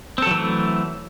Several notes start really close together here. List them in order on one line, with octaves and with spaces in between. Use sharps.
C4 A4 F#3 E3 A3